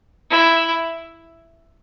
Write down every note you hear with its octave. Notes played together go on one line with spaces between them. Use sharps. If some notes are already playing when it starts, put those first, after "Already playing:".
E4